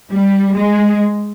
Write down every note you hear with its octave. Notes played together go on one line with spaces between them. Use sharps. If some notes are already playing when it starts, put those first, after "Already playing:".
G3
G#3